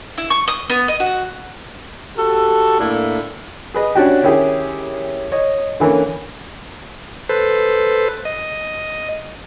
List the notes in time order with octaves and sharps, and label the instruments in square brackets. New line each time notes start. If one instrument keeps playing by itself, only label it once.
[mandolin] E4
C#6
D#6
B3
D#5
F#4
[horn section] F#4 G4 A4
A2 A#3 D4 E4 E5
[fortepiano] G#4 B4 D#5
C#4 D4 F#4 G4
D#3 C#4 E4 G4 G#4
C#5 D#5
D3 E3 A#3 C#4
[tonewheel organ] A4 B4 C5
D#5